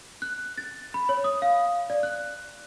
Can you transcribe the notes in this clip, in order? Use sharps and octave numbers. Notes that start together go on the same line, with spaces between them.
F#6
A6
B5
C#5
D#6
F5
D5
F#6